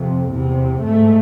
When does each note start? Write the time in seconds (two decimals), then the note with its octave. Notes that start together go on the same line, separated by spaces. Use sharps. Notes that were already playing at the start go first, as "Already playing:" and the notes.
Already playing: F2 C3
0.27 E2 C3
0.81 G#2 A3